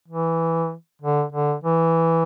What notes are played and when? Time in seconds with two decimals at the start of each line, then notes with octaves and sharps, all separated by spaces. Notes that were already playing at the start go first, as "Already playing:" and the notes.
0.08 E3
1.02 D3
1.32 D3
1.64 E3